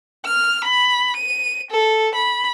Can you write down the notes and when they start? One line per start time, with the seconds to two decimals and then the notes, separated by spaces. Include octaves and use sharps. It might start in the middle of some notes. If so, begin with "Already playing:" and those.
0.25 F6
0.64 B5
1.16 D#7
1.71 A4
2.15 B5